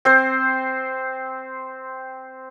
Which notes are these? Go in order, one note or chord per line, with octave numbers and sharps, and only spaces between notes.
C4 C5